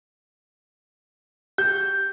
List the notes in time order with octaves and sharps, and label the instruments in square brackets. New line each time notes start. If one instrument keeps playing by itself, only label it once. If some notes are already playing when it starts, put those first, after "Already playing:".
[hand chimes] G4 [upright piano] G6